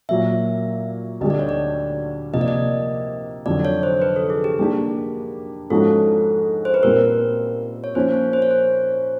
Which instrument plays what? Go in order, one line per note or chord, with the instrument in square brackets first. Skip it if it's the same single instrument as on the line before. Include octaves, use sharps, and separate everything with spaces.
[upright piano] A#2 F#3 A#3 [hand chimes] E5
[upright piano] D2 D3 G3 [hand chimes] D#5
[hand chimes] D5
C#5
D5
[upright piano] C3 F3 A#3 [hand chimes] D#5
[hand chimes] D5
D#5
[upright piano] F2 D3 F#3 [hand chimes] D5
[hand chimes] C#5
C5
B4
A4
G#4
G4
[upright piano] G3 A#3 D4 G4 [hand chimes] G#4
[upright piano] G#2 F3 G#3 C#4 F#4 [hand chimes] A4
[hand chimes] C5
B4
[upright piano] A#2 G3 C4 [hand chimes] A#4
[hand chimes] C#5
[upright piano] F3 A#3 C#4 [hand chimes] C5
[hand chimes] C#5
C5
C#5
C5